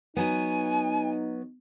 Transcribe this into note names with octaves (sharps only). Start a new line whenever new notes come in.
F#3 B3 D#4 G#5